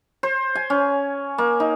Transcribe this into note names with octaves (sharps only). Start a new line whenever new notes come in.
C5
G#5
C#4
A#3
D#4